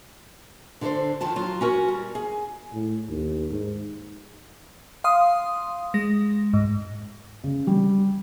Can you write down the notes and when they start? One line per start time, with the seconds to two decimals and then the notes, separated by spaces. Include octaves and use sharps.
0.81 D3 D4 A4 B4 C5
1.21 F2 D#3 F3 A5
1.36 F#3 F4
1.61 C#4 F#4 A#4
1.88 G3
2.15 G#4
2.73 A2
3.09 D#2
3.51 G#2
5.04 F5 C6 D#6
5.94 G#3 A#6
6.53 G#2
7.44 C#3
7.67 G3